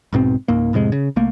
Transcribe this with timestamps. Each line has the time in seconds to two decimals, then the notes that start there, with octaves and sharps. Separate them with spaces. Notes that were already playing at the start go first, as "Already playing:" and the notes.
0.13 B1 G#2 B2 C4
0.48 C#2 G#2 A#3
0.73 F2 A2 C3 G#3
0.92 C#3
1.16 C2 A3 A#3